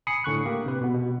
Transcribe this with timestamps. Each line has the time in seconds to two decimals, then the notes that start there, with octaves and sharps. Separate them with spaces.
0.07 G#5 B5 D#6 C7 C#7
0.24 A2 D3 C#6 F#6
0.45 A#3 G4
0.66 C3 B4
0.81 B2 B3
0.94 B2